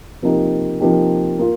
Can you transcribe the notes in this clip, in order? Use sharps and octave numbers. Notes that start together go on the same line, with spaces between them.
C3 F3 A#3 D#4 G4
C3 F3 A#3 D#4 G4
A#3 F4